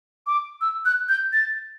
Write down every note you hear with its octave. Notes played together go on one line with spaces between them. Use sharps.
D6
E6
F#6
G6
A6